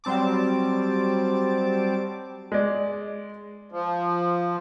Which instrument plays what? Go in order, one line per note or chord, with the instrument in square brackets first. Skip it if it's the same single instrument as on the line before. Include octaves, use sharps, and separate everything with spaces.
[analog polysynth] F#3 G3 C4 A5 D6
[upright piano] G#3 D5
[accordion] F3